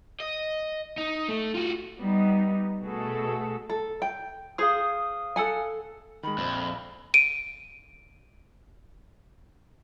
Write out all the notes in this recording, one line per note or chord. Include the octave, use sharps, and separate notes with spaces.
D#5
D#4
A3
F4 F#4
G3 B3 D#4
B2 A3 F#4 G#4 A4
A4
G5
G#4 C5 F5 D#6
A4 F#5 G#5
D#3 G#3 B5
A#1 F2 C5
D7 D#7